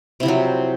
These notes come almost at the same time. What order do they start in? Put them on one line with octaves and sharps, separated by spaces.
C3 E4 F3 F#3